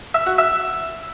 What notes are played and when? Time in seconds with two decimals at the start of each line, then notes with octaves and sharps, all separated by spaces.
0.14 E5
0.26 F#4
0.38 E5